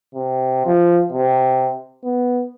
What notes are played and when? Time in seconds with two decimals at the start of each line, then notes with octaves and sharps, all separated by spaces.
0.14 C3
0.66 F3
1.12 C3
2.04 B3